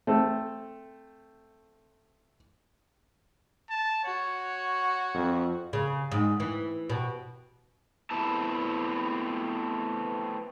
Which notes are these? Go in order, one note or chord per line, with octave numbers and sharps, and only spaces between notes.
A3 C4 A4
A5
F#4 C#5
F2
C#3
G#2
E3
B2
A3 B3 C4 E4 A5